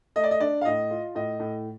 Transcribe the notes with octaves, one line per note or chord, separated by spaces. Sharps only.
A3 D#5
D5
D#5
D4 D5
F5
A2 D#5
F4
A2 D#5
A2